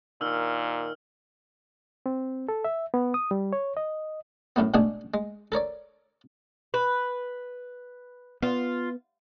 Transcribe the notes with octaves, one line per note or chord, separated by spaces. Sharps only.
A#2 D#3 E6 F6
C4
A4
E5
B3
D#6
G3
C#5
D#5
F#2 A2 A3 B3
G#2 B2 D3 A3 D4 G#4
G#3
A4 A#4 C#5 D5
B4
B3 F4